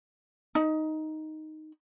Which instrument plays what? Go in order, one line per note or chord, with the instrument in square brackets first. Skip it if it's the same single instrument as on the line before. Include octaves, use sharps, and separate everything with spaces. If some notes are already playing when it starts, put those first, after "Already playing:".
[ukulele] D#4